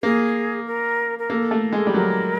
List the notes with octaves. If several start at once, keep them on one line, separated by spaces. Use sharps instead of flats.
A#3 G#4
A#4
A#4
A#3 A4
A3
G#3
G3
F#3 A#4